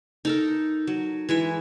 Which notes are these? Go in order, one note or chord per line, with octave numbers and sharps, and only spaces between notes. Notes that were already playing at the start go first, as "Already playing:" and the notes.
D#4 A4 A#4
F#3
E3 G#3 E5